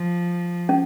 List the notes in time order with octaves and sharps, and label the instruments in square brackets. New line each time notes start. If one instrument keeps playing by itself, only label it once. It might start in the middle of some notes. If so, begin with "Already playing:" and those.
Already playing: [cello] F3
[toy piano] C#4